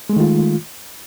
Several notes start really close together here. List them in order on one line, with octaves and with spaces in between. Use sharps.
G#3 A3 D#3 F4